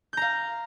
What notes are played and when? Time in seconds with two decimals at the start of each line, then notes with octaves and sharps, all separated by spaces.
0.13 G6
0.17 A#5
0.22 F5